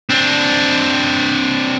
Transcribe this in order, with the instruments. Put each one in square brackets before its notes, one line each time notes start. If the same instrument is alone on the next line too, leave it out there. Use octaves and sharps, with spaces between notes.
[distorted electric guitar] C4 D4